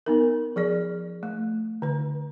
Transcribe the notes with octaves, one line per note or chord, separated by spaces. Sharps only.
B3 D#4 A#4
F3 G#4 D5
A3
D3 B4